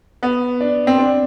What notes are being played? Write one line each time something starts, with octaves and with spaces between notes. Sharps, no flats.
B3
D4
C4
D4